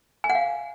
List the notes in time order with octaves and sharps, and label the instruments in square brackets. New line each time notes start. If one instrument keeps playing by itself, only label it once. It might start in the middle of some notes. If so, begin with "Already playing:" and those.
[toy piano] G#5
F#5
F5